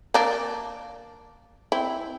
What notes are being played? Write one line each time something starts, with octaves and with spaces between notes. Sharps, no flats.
A#3 D4
C4 E4